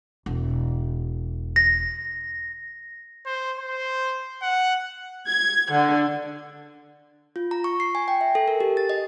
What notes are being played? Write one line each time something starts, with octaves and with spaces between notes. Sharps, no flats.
E1
A#6
C5
C5
F#5
G#6
D3
F4
A#5
C#6
C7
G#5
G5
E5
A4
A#4
G4
A6
D#5